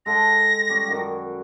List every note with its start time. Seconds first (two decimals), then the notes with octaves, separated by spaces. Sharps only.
0.06 G#3 A4 G5 A#6
0.69 G3 C#4
0.88 F#2 D#3 F#4